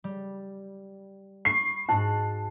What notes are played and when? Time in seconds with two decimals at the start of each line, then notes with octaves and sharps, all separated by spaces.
0.04 G3
1.45 B5 C#6 C7
1.89 G#2 F#4 A5 F#6